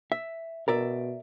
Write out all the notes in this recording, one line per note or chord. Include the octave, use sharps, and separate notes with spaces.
E5
B2 A#4 D5 E5